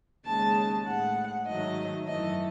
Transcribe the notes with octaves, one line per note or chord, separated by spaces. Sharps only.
D#2 C#3 G#3 A5
A2 G#3 F#5
G#2 D#3 F#3 A3 D#5
F#2 E3 A3 D#5